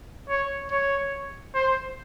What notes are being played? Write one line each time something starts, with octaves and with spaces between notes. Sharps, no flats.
C#5
C#5
C5